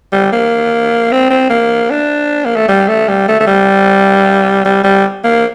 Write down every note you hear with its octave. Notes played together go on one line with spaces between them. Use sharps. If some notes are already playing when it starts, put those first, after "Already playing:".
G3
A#3
C4
C4
A#3
D4
A#3
A3
G3
A3
G3
A3
A3
G3
G3
G3
A#3